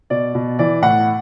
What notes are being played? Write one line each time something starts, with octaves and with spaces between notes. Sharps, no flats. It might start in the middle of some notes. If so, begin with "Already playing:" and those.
B2 D5
B2
E3 D5
A2 F#5